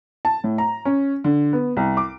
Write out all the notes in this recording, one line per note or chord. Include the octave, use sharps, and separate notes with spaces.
A5
A2
A#5
C#4
D3
B3
C2
D6